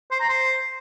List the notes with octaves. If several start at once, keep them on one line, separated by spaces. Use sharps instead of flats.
C5
A#5
C5